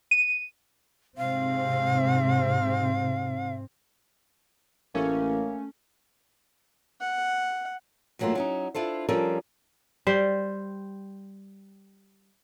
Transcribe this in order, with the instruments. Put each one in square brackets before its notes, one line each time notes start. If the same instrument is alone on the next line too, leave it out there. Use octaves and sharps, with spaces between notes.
[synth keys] D#7
[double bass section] G#2 C3 C4 [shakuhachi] F5
[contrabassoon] A1 [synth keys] A3 C#4 [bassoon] A#3
[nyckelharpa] F#5
[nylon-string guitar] G2 E3 F#3 A3 A#3 F4
F#3 C#4 D#4
D4 E4 F4 A4 C5
F3 G3 C#4 A4 A#4 C5
[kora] G3 C5